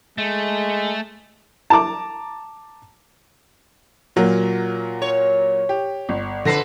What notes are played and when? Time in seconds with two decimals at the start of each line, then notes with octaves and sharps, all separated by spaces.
0.18 G#3 A3
1.70 A5 A#5 D6
4.16 A#2 F#3 A#3
5.02 C#5
5.69 G4
6.09 G1
6.45 F2 D3 A4 B4 A#6 C7